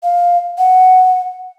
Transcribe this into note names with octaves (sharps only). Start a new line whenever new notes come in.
F5
F#5